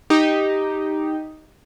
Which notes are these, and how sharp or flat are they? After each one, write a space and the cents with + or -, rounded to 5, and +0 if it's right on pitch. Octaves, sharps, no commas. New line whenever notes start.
D#4 +0 G4 +0